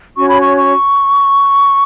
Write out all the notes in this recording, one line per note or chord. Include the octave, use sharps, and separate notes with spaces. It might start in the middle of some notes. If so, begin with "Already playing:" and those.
C#4 F#4 C#5 C#6
B5
C#6
C#6